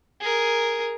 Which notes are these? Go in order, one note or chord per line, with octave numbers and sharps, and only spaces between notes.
G#4 A#4